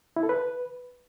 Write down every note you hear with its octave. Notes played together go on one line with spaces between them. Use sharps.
E4
A4
B4